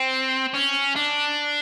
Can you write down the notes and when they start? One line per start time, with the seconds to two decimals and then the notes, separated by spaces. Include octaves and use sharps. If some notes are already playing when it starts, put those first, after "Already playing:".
Already playing: C4
0.54 C#4
0.96 D4